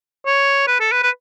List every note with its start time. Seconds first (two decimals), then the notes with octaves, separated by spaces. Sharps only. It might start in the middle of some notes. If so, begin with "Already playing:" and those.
0.26 C#5
0.67 B4
0.80 A4
0.92 B4
1.03 B4